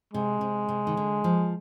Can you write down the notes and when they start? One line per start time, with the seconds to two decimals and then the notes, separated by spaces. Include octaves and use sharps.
0.13 C3 G#3
0.41 C3
0.69 C3
0.87 D#3
0.97 D3
1.24 F3